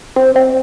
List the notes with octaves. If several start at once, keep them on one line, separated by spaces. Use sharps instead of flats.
C4
C4